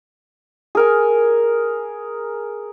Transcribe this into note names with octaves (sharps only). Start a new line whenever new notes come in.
G#4 A#4 G#5